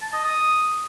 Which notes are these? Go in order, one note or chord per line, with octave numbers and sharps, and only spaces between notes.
A5
D#5
D#6